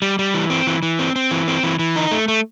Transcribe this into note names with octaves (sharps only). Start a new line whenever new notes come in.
G3
G3
E3
C4
E3
E3
C4
C4
E3
C4
E3
E3
D#4
A3
A3